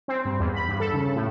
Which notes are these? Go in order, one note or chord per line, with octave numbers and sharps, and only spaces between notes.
C4
G2
E2
B5
G2
A4
C#3
A2